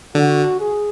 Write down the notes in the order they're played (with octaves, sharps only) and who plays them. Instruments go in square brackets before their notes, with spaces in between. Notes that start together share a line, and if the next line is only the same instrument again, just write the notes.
[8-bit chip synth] D3 [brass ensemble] F#4
[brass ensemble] G#4